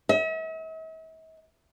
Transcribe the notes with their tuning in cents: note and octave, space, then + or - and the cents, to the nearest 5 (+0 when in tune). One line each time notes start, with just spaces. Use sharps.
E5 -45